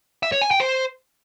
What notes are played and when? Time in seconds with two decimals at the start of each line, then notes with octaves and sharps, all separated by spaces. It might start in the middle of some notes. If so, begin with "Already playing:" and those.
0.23 E5
0.32 C#5
0.42 G#5
0.51 G5
0.60 C5